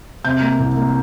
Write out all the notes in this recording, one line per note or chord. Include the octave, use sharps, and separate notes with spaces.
C3 G6
A#3
C2
A#3